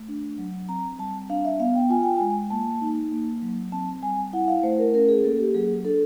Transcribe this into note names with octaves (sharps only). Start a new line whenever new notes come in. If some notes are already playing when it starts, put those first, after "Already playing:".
Already playing: A3
D4
F#3
C4 A#5
G3 A5
D4 F5
E5
B3 F5
G5
F4 G#5
G5
G#3 G#5
A#3 A5
D#4
A#3
F#3
C4 A5
G3 G#5
E4 F#5
F5
A3 C5
A#4
C#4 A#4
G#4
A#3 A4
G4
F#3 G#4
D4 A4